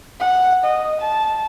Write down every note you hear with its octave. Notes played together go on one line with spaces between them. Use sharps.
F#5
D#5
A5